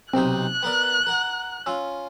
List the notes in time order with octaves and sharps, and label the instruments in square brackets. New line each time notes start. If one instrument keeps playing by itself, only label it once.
[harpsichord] B1 C3 D#4 [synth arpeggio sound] C4 [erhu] F#6
[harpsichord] B3 A#4 D5
A#4 F#5
[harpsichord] C#4 F4 [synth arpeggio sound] E6